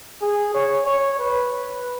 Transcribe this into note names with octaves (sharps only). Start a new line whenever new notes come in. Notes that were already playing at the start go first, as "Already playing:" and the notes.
G#4
C#5
C#5
B4